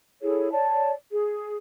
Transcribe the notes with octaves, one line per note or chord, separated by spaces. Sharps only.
E4 G#4 A4 C#5
C#5 D5 A5
G#4